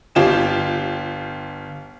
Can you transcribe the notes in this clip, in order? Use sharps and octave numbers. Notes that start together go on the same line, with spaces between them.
G1 F4 G4 E7